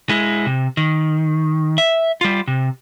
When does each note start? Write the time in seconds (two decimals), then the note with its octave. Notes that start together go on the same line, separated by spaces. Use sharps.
0.09 G#3 E4
0.46 C3
0.77 D#3
1.78 E5
2.21 G3 F4
2.48 C3